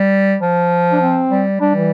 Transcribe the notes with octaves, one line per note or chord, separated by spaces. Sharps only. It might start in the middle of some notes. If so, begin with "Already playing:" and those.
Already playing: G3
F3
D4
C4
G3
G3 D4
E3